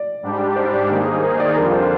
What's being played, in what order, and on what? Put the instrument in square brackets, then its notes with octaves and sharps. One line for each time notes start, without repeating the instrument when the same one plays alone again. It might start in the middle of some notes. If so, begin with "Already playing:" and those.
Already playing: [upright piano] D5
[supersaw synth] G#2 G3 D4 G4
[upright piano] C5
D5
[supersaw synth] D#3 A#3 D#4 G#4 [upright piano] C5
[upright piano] C5
C5
D5
[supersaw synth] F2 D3 G3 D4 F4 [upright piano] A#4
[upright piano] C5